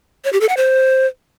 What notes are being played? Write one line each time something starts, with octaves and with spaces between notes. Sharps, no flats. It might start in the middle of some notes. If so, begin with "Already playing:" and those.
C#5
G4
A4
F#5
C5